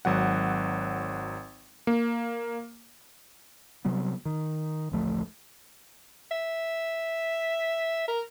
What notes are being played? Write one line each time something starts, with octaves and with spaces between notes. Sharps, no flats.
G#1 F#3 F#5
A#3
C3 F#3 G3 B3
D#3
A1 D2 F3 A3
E5
A#4